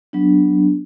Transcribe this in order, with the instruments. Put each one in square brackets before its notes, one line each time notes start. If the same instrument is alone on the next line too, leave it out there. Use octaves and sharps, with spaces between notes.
[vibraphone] F#3 B3 D4